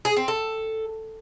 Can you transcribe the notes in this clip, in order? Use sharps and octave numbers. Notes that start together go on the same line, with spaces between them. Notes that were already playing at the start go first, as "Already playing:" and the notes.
G#4
C4
A4